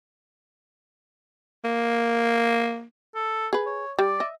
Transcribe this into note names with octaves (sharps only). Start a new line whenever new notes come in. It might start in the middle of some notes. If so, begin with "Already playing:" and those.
A#3
A4
G#4 B4
C#5
G3 D5
D#5 E5